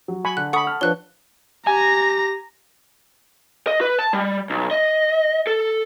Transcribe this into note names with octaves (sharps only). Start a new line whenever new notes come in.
F#3
G#5 B5 C#6
D3 F#6
A4 F#5 B5 C#6 D#6
A5 F6
F3 D4 B4 C#5 F#6 G7
G4 G#5 A#5 A#6
D#5
B4
A5
G3
B1
D#5
A4